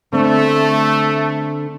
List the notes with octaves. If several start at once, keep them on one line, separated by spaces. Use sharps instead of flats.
D3 A3 C4